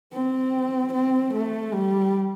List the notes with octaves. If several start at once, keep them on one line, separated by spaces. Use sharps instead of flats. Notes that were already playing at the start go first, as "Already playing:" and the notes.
C4
C4
A3
G3